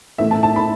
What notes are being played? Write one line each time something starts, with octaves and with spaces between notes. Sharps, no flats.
A2 E3 A3 E5
A5
A5
B5